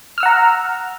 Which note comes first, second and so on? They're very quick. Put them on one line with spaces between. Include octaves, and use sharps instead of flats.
F6 E6 F#5 A#5